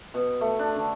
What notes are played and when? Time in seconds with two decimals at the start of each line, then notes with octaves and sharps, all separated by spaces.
0.14 B2
0.41 A3
0.59 D4
0.76 D3